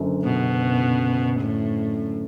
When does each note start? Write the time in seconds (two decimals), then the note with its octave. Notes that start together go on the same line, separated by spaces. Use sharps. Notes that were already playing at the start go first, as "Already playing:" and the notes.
Already playing: F#1 F#2 D3
0.24 B2
1.40 A2